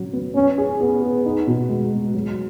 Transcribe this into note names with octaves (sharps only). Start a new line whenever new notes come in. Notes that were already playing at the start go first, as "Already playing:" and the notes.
Already playing: C#3 F#3
B3
B3 C#4
G#4
B3 G#4
G#4
D#4
B2
G#3
G#3
F#3